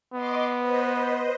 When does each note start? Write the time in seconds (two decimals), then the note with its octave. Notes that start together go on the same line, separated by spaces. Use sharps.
0.14 B3 D#5 C6 D6
0.59 B4 C5 D#5